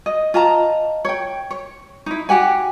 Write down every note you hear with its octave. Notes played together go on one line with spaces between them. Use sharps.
D#5
F4 D#5 A5 A#5
C#5 G5
C#5
D#4 E4
F#4 G4 F#5 G#5